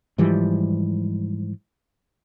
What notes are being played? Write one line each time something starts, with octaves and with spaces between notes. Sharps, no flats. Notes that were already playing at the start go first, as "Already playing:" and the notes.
G#2 E3 F3 G3